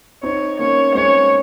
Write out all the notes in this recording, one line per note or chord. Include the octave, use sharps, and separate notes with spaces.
C4 D#4 C#5
A#3 C#4 C#5
G#3 C4 C#5